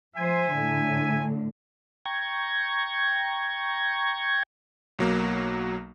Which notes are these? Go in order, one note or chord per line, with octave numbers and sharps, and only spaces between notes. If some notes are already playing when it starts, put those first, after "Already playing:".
F3 C5 E5 G#5
A2 D3
G5 A#5 C#6 G#6
B1 F#3 A#3